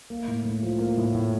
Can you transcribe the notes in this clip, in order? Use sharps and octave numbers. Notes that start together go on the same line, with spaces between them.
A#3
A2
A2
F3
A#3
A2
A2